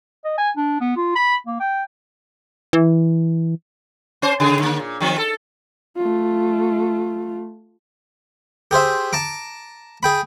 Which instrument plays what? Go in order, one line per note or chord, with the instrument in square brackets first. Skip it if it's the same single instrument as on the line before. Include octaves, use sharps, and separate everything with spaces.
[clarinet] D#5
G#5
D4
B3
F4
B5
A#3
G5
[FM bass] E3
[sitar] C#4 C5
C#3 G#4
D3 A#3
A#2
D#3 F3 C4
A4
[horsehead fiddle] A3 F4
[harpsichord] G4 G#4 C5 E5
A5 A#5 D6
G#4 G5 B5